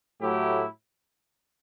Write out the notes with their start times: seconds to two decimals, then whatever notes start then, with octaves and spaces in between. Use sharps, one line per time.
0.21 A2 F#3 A3 E4 G4